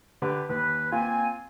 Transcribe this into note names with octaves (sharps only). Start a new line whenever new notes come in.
D3 G4 B4
D#2 B4
A#3 C4 F4 G#5